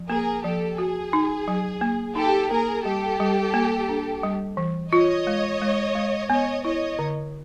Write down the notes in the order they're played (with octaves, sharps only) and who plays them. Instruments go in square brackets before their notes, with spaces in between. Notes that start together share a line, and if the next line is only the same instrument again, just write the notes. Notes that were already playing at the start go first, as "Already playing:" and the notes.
Already playing: [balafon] F3
[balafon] A#3 [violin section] G#4 A#4
[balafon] F3 [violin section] G4 A4
[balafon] F#4 [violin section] G#4
[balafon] D#4
F#3
A#3
[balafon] D#4 [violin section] G4 A4
[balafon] A#3 [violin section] G#4 A#4
[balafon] G3 [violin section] G4 A4
[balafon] G3
A#3
D4
G3
E3
[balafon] F4 [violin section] C#5 D#5
[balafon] G#3
G#3
G#3
[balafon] B3 [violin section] C#5 D#5
[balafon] E4 [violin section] C#5 D#5
[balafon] D3